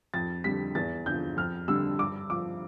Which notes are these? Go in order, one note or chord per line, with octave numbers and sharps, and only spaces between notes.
F2 A6
D3 G3 B6
E2 A6
D3 F3 G6
F2 F6
D3 G3 E6
G2 D6
F3 D6